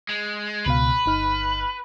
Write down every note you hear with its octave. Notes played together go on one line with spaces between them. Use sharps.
G#3
C#2 B2 B4 F5
G1 D#4 F6